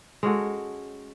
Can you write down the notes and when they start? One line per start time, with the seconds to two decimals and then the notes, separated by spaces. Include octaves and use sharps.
0.23 G#3 C#4 F#4 A4